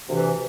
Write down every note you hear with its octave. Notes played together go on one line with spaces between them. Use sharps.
D2 C3 E3